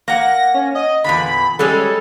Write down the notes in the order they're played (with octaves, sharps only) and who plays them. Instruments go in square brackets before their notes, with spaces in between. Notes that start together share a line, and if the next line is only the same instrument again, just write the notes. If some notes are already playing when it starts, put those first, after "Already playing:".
[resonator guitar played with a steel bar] A#3 F#5 [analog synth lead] A#6
[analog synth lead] C#4
D#5
[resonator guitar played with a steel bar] E2 A#2 D3 [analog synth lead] B5
[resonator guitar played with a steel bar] G3 G#3 C#4 [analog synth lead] A4